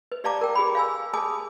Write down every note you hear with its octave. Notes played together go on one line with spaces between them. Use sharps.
B4
G4 D5 F5 A5 A#5 D6
A#4 G5
G4 G#4 B5
F5 G#5 E6
G#4 G#5 A5 D#6